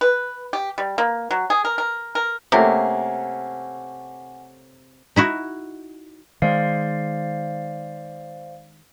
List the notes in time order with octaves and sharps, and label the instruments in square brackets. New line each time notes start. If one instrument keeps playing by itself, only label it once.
[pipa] B4
G4
G3
A#3
F#3
G#4
A#4
A#4
A#4
[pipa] C3 [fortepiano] A3 A#3 C#4 [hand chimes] F#5 G#5
[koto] D#4 E4 F#4
[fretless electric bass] D#3 G#3 [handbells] C5 D5 F5